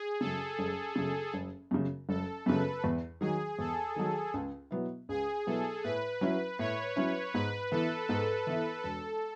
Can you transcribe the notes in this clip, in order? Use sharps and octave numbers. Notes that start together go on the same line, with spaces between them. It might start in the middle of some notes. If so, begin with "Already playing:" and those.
Already playing: G#4
F#2 C#3 A4
F#1
F#2 C#3
F#1
F#2 C#3
F#1 A4
F#2 C#3 B4
E2
D#3 F#3 G#4
E2 A4
D#3 F#3
C#2
B2 F#3 B3 E4
C#2 G#4
B2 F#3 B3 E4 A4
A2 B4
F#3 C#4 E4
A2 C#5
F#3 C#4 E4
G#2 B4
E3 B3 E4 A4
G#2 A4
E3 B3 E4
E1 A4